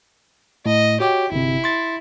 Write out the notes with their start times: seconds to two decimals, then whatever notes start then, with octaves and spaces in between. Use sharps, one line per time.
0.66 A2 D#5
1.00 F#4 G4 C#5 D6
1.32 G1 C3 E4
1.64 C6 A6